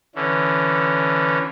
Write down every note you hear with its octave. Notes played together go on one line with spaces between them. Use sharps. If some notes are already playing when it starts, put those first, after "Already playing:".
D3 E3 C#4